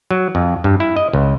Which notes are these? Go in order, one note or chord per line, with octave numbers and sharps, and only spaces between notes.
F#3
F2
G2
E4
D#5
C#2